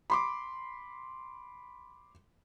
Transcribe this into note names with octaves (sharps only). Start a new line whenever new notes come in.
B5 C6 D6